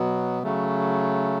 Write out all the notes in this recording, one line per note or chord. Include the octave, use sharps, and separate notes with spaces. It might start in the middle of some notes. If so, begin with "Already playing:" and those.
Already playing: B2 F#3 B3
C#3 F#3 A3